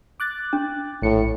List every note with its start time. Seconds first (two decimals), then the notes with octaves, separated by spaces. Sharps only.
0.20 D6 F#6 A6
0.53 D4
1.02 A#1 A2 C#7